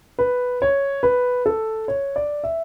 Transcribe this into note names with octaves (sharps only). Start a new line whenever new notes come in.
B4
C#5
B4
A4
C#5
D5
E5